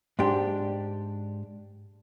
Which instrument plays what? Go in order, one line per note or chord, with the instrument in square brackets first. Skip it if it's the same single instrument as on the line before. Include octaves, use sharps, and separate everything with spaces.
[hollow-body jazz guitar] G#2 D4 G4